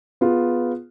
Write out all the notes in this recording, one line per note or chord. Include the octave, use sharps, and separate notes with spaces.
B3 F4 G#4